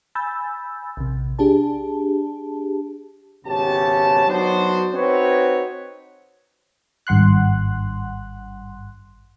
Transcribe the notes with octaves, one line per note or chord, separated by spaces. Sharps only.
G#5 B5 E6 G6 A6
A#1 C3
D4 G4 G#4 A5
G#1 C#2 B2 G4 C#5 A5
F#3 B3 D4 D#4 F#4 C5
C4 D#4 F#4 B4 C#5
G#1 G2 F#5 C6 F#6